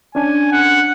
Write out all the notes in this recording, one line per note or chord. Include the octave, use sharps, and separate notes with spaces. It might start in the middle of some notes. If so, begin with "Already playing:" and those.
C#4 D4 G#5
F#5